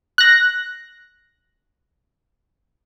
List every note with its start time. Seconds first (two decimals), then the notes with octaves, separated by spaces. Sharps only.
0.18 F#6 A#6